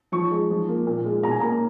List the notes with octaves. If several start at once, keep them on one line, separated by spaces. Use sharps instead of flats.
F3 C#6
G#3
F3
A#3
A#2
G#3
B2 A#5
G#5
A#3 A#5